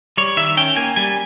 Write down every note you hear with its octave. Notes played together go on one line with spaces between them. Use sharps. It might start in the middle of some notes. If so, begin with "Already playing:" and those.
G3 C#5
D#3 E5
C#4 G5
A#3 G#5
G3 G#5